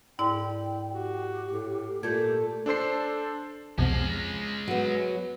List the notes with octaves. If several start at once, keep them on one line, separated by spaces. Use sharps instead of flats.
D2 G#2 E4 D5 G5
F#4 G4
A2
A#2 A3 A4 G6 G#6
D4 A4 C5 C7
C2 F2 B2 G#3 C#4
F#3 B3